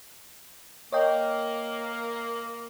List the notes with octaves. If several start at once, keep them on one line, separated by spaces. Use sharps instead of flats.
A#3 C#5 D#5 G5